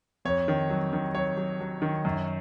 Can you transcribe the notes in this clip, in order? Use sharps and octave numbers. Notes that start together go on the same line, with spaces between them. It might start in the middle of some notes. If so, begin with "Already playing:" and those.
F2 C#5
D#3
F#3
D#3
F#3 C#5
F#3
F#3
D#3
F#2